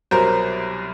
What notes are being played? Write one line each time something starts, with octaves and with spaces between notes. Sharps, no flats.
C2 B2 F#3 A#4 C5